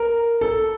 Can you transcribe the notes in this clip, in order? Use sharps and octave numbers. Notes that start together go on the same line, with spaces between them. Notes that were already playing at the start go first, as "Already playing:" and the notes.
Already playing: A#4
A4